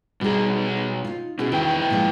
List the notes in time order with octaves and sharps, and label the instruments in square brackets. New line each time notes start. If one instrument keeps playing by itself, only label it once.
[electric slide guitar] B2 D#4 [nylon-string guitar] G3 G#4
[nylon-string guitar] D#4 F4
[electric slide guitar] B2 [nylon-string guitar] C#4 E4 G#4
[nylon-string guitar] E2 D#3 [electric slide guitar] E4 B4 G5
[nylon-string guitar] A#2 F3 G#3